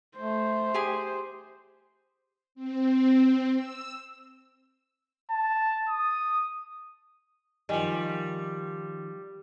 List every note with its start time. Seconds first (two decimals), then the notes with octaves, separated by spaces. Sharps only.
0.17 A3 C5
0.74 G4 G#4 G#5
2.55 C4
3.55 E6
5.31 A5
5.89 D#6
7.69 D#3 F3 G3 D#5 G#5